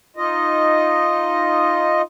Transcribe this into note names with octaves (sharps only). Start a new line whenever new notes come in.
D#4 F4 D#5